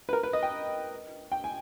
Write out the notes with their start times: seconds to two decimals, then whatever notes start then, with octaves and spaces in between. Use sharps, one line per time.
0.09 B4
0.13 A#4
0.23 B4
0.33 D#5
0.43 G5
1.32 G5
1.44 G#5